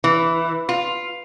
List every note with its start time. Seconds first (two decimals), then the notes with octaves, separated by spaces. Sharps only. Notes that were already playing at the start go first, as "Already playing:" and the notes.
0.04 E3
0.69 F4